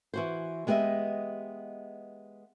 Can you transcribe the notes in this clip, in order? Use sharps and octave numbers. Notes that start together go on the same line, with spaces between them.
E3 F#4 C5
G#3 B3 G4 G#4 D#5 E5